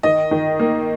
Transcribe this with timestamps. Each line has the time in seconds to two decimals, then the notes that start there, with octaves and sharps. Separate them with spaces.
0.03 D#3 D#5
0.31 D#3
0.59 A#3